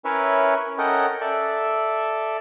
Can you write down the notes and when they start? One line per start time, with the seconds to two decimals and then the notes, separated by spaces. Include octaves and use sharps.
0.05 C#4 E4 A#4 B4 C#5 E5
0.78 C#4 A4 A#4 D#5 F#5 G5
1.21 A4 D5 E5